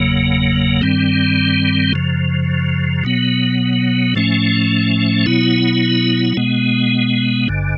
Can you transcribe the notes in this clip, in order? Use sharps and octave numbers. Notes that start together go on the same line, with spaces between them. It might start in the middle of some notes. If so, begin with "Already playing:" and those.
Already playing: F#1 E2 C#3 F#3 A#3
G2 D#3 G3 C4
F#2 C#3 F3
B2 F#3 B3
A2 F3 A3 C#4
B2 F#3 B3 E4
B2 G#3 B3
G#1 G2 D3